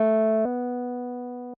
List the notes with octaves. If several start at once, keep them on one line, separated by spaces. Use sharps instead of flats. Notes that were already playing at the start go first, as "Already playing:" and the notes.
Already playing: A3
B3